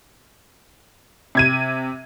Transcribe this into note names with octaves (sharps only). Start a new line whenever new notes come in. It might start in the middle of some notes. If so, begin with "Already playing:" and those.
C3 G#6 D#7